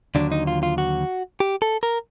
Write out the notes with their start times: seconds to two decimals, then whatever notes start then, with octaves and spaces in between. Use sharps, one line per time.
0.15 D#2 D3 F#3 D4
0.32 D#4
0.47 F4
0.63 F4
0.78 F#4
1.40 G4
1.62 A4
1.83 A#4